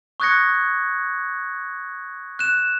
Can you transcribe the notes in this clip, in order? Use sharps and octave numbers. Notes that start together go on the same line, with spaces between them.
C#6 D#6 F#6 G#6 A#6 C#7
F#6 E7